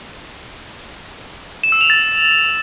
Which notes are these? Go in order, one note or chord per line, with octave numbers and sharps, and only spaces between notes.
E7
E6
F7
A6